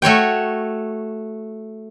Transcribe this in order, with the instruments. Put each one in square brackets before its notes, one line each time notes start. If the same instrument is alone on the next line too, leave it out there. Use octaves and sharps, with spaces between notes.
[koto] A3 F#4 C#5 G5